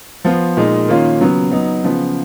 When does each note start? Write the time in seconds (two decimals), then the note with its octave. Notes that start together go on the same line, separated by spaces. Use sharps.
0.25 F3 B3 F4
0.57 A#2 G#3 D#4
0.88 D#3 A#3 C#4 F4
1.21 C#3 F#3 B3
1.51 F#3 B3 D#4
1.84 C#3 F3 B3